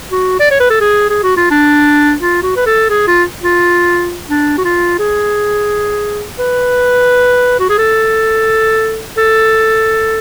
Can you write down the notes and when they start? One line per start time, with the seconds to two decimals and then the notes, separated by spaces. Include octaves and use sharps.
0.11 F#4
0.40 D5
0.51 C#5
0.60 B4
0.70 A4
0.81 G#4
1.10 G#4
1.23 F#4
1.37 F4
1.51 D4
2.20 F4
2.43 F#4
2.56 B4
2.66 A4
2.90 G#4
3.07 F4
3.43 F4
4.30 D4
4.58 F#4
4.64 F4
4.99 G#4
6.39 B4
7.60 F#4
7.69 G#4
7.78 A4
9.18 A4